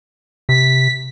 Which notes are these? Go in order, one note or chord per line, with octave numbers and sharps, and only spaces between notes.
C3 B6